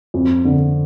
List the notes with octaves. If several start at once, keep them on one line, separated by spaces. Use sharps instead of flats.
F2
D3